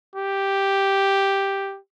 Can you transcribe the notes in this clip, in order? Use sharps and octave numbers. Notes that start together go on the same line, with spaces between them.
G4